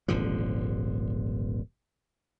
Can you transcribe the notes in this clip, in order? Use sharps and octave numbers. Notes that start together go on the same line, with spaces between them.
D#1 G#1 D3 F3